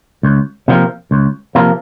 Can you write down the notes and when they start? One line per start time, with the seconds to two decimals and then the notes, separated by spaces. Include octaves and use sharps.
0.23 C#2
0.68 C3 F3 A#3
1.11 C#2
1.55 C3 F3 A#3